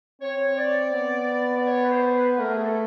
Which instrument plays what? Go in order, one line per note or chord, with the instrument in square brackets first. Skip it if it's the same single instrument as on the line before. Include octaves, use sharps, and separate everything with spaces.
[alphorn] C4 [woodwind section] C#5
[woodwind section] D5
[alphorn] B3
[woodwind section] D5
C#5
B4
C5
B4
[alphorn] A3 [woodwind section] A#4
[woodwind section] G#4
A4